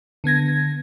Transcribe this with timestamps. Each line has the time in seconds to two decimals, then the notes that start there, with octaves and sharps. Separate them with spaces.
0.24 D3 B3 G#6 A#6